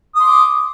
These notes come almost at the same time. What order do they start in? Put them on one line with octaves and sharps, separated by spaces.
D#6 C6 D6